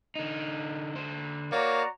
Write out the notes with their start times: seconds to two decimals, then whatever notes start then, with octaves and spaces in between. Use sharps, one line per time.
0.16 D3 D#4
0.96 D3 C5
1.52 A#3 F#4 C#5 D5 A#5